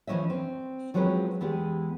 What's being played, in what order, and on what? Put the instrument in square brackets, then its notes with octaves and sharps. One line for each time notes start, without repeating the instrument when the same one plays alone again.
[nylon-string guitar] E3 F3 A#3 C#4 D#5 E5
C4
F3 F#3 G#3 C4 C#4 B4
E2 E3 G#3 B3 G4